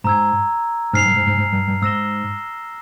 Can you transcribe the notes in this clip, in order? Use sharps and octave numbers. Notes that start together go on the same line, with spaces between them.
G#2 A#5 E6 G#6
G#2 F6 C7 F7
G2
G#2
G#2
G#2
G2
G2
G#2 E6 A#6 E7 G7